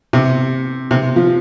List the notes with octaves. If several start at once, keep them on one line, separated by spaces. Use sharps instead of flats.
C3
C3
F3